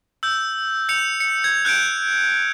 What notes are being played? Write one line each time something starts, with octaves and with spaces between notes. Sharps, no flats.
E6 G6
G6 C#7 F7
C#7
G#6
F#6 G6 C#7 D7